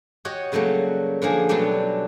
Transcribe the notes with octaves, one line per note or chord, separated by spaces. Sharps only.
F#4 G4 C#5 D#5 F#5
C#3 F#3 G3 A3 A#3
D3 F3 A#3 G#4
B2 F#3 G3 A3 D4 G4